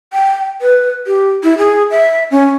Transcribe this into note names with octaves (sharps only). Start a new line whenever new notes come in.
G5
B4
G4
E4
G#4
E5
C#4